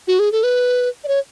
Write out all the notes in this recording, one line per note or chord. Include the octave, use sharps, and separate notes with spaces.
F#4
G#4
A4
B4
D5
C#5